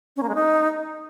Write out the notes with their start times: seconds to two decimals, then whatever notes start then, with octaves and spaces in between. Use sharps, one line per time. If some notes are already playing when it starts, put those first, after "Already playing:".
0.16 C#4
0.23 A#3
0.29 G#3
0.35 D#4